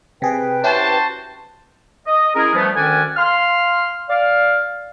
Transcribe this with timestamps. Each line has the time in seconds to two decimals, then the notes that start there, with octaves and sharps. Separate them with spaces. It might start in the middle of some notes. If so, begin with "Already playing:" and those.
0.22 C3 G#4 B4 G5
0.64 C#4 E4 F#4 G4 C5 A5
2.06 D#5
2.35 G#3 C#4 E4 G#4 A#4
2.55 E3 F3 G3 A3 B3
2.76 D2 D#3 C#4 D5 F#5 G#5
3.17 F5 C6 F6
4.09 D5 F5